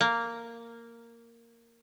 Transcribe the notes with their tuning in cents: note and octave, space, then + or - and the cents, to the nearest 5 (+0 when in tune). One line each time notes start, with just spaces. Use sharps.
A#3 -5